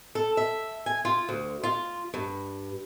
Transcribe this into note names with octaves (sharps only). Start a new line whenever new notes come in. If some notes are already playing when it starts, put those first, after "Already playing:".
A4
E5
G#5
F4
D2
F4
G2